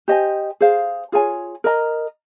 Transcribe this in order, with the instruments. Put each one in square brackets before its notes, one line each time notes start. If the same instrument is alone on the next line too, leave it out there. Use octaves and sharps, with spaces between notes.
[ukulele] G4 C5 D#5 G#5
G#4 C5 F5
F4 G#4 C#5 G#5
A#4 D#5 A#5